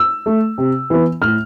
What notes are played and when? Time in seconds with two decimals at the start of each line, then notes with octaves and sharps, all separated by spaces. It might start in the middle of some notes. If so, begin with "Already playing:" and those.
Already playing: E6
0.26 A3
0.58 C3
0.90 E3 B3
1.22 A2 F6